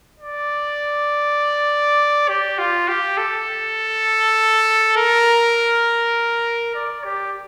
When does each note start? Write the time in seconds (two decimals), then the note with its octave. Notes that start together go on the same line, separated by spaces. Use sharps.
0.20 D5
2.28 G4
2.58 F4
2.88 G4
3.18 A4
4.97 A#4
6.75 D5
7.04 G4